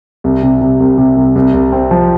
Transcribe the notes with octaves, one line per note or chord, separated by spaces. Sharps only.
C2
C3
C3
C2
C3
C2
C2
C2
C4
F3